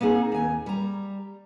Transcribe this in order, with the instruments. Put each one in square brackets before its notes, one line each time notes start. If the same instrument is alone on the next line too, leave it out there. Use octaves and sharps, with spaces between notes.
[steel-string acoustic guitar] A#3 C4 D#4 G#4
D#2 G#5
G3 A#5